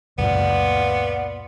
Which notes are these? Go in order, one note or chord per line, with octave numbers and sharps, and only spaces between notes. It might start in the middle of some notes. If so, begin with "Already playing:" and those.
C#2 F#2 A#2 B3 F4 D5